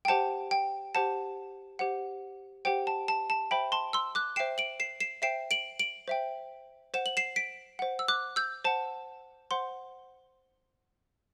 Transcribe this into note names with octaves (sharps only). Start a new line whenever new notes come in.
G5
G4 C5 F#5 A5
G5
G4 C5 F#5 A5
G4 C5 F#5
G4 C5 F#5 G5
A5
A5
A5
C5 E5 G5 B5
A5 C6
C6 E6
D6 F#6
C5 E5 G5 C7 E7
D7 F#7
C7 E7
C7 E7
C5 E5 G5 C7 E7
D7 F#7
D7 F#7
C5 E5 G5
C5 F#5 E7
F#7
C7 E7
B6 D7
C5 F#5
E6
D6 F#6
E6 G6
C5 F#5 A5
C5 F#5 C6